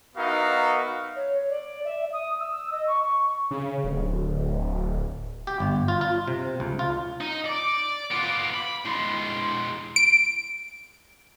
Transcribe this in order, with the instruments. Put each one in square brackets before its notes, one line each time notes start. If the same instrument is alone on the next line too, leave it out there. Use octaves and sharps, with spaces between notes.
[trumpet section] B3 D#4 F#4 A#4 E5 F5
[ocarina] C#5
D5
E5
D#6
E6
D#5
C#6
C#6
[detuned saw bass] C#3
D1
[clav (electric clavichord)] G4
G1
F4
F4
C3
C#2
F4
[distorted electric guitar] D#4
[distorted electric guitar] D5 [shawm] D6
[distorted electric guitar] B3 F4
B5
[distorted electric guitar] G#3 E4 [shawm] C6
[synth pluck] D7